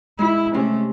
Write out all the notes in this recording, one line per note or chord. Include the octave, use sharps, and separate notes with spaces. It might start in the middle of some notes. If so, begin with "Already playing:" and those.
G#3 E4
C3 A3 C#4